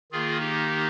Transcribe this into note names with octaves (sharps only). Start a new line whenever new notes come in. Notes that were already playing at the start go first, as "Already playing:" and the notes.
D#3 A#3 F4 G#4
D#4 G4